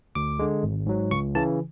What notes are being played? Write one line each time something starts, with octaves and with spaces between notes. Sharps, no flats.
D2 D6
D3 G#3
G#1
G#2 F#3
C#2 C#6
C#3 E3 A5